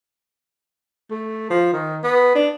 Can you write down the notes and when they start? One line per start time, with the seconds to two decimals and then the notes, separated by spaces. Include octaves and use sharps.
1.10 A3
1.50 F3
1.73 D#3
2.04 B3
2.35 D4